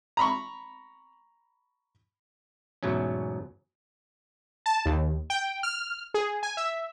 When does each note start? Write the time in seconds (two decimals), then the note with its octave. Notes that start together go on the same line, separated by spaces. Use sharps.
0.17 A#5 B5 C#6
2.83 E2 G#2 B2 F#3 A3 C#4
4.66 A5
4.86 D#2
5.30 G5
5.63 F6
6.14 G#4
6.43 G#5
6.57 E5